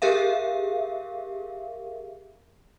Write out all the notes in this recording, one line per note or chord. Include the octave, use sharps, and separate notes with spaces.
G4 G#4 A#4 E5 F5